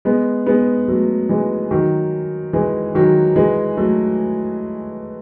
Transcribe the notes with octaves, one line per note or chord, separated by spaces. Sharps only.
G#3 B3
G#3 B3
F#3 A3
E3 G#3
D#3 F#3
E3 G#3
D#3 F#3
E3 G#3
F#3 A3